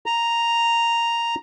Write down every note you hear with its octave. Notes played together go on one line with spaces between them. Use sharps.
A#5